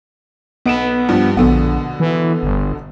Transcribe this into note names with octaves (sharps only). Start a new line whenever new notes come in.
B1 B3 D7 E7
G2 F3 G3
A#1 B2 D3 B3
E3
G1